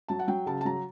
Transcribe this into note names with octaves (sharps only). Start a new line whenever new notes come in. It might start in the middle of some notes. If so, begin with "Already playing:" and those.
F#3 A5
F#5
F#3 G5
C#3 A5
A5
F#3 A#5